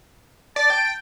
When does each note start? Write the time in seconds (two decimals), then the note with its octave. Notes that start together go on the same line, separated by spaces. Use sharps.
0.56 D5 A5
0.70 G5